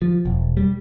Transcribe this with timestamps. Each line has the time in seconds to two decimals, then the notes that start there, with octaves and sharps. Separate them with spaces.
0.02 F3
0.25 E1
0.57 G3